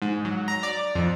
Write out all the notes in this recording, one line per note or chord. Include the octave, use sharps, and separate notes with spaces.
G#2
F#3
A#5
D5
F2